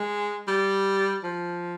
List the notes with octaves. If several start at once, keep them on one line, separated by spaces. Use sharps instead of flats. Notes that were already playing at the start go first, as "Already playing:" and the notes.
Already playing: G#3
G3
F3